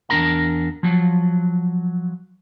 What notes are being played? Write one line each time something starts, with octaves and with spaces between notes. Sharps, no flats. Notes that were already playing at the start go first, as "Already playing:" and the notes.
E2 D#3 D4 A#4 A#5
F3 F#3